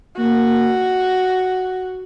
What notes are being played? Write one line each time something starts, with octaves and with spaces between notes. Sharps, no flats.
A#3 F#4